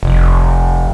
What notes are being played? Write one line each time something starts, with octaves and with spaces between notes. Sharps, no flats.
F1